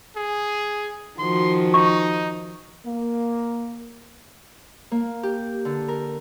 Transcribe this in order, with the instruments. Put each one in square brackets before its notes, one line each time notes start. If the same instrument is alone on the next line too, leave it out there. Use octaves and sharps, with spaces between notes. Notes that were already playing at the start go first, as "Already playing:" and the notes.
[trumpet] G#4
[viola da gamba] D#3 F3 F#4 [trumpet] C6
[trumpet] D#4 [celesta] C#6
[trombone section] A#3
[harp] A#3
G4
D3
A#4